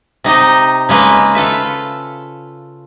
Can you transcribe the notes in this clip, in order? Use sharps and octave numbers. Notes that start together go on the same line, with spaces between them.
C3 D#4 G4 D#5
C#3 G#3 A#3 B4
F4 A4 B4 E5